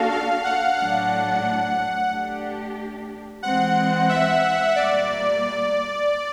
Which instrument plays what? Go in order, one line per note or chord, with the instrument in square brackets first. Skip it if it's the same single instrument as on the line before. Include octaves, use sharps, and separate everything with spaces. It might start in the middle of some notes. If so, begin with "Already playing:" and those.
Already playing: [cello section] A#3 D4 F#4 A4 [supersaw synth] F5
[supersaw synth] F5
F#5
[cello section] A2 F#3 A3 D4 [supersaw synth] F#5
[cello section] A3 D4 G4
[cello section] E3 G#3 C4 [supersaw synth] F#5
[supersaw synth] E5
[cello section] A#2 G3 A#3 [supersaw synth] D5